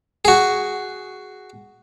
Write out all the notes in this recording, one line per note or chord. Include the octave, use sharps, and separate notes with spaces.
F#4 G#4